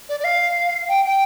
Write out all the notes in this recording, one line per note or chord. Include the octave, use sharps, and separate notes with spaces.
D5
D5
F5
G5
G5